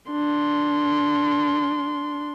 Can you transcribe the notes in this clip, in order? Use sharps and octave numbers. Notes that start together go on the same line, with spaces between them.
D4 C6